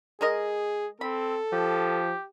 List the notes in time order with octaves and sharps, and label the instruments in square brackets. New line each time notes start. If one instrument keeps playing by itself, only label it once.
[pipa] G#3 A#4 D#5 [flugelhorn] G#4
[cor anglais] C4 [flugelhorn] A4 [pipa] B5
[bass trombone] F3 [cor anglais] G4